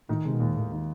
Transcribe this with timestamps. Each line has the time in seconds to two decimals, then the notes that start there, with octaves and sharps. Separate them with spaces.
0.09 A2 D#3
0.25 C3 G#3
0.33 B2
0.40 D#2 A#2
0.56 D#2 A2
0.72 D#3